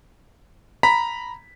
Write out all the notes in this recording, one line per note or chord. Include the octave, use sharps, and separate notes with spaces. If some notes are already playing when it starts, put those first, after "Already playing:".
A#5 B5 B6